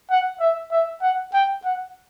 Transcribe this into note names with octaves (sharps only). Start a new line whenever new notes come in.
F#5
E5
E5
F#5
G5
F#5